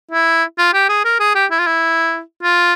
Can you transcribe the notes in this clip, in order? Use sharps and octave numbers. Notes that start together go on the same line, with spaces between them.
E4
F4
G4
G#4
A#4
G#4
G4
E4
F4
E4
F4